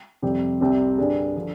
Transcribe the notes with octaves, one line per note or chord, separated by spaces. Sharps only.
F2 C3 G3 C4 G4
C2 C3 G3 C4 G4
G2 D3 G3 D4 G#4
D3 F3